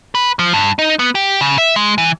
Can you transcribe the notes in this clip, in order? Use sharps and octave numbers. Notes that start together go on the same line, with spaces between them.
B4
F3
G2
D#4
B3
G4
C#3
E5
G#3
E3